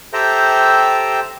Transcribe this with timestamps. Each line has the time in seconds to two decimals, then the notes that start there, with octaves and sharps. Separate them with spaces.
0.13 G4 A4 C5 E5 G5 A#5